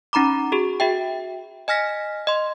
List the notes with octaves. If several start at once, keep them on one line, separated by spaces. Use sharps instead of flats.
C#4 D#4 A#5 B5 D6
F#4 G#4
F#4 E5 G5
D#5 G#5 F6 A#6 B6
D#5 C6